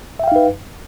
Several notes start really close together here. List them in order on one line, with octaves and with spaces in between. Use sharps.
E5 G5 F5 D#4 B4